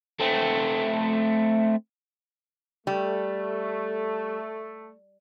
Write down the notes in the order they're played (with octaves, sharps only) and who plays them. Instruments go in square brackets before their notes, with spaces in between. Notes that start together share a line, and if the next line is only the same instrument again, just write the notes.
[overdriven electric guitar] A3 C4
[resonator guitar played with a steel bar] G3 [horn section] A3